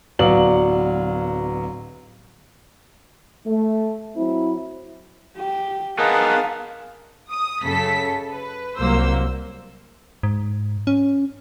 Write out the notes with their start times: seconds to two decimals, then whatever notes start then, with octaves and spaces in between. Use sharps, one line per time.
0.19 D1 F#3 B3 D5 F5 F#7
3.47 A3
4.16 F#3 C4 E4
5.37 G4
5.98 B3 D#4 G#4 A#4 F5 A5
7.31 D#6
7.63 F#2 C#3 A4 B6
8.32 B4
8.77 C2 F#3 A#3 C5 E6
10.23 G#2
10.87 C#4